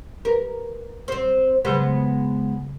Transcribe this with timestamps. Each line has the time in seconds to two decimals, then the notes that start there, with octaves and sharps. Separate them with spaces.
0.25 A#4 B4
1.08 C4 C5
1.65 C#3 F#3 G#3 B3 C5